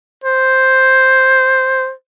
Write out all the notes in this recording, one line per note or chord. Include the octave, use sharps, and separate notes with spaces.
C5